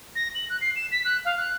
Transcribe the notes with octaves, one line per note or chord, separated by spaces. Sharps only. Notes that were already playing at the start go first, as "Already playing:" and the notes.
A#6
F#7
F#6
C7
E7
B6
F#6
F5
F#6